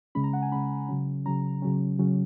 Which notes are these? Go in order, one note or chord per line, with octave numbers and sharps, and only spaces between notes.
C#3 G#3 C#4 B5
A#5
F#5
G#5
C#3 G#3 C#4 B5
C#3 F#3 C#4
C#3 F#3 C#4 A#5
C#3 F#3 C#4
C#3 F#3 C#4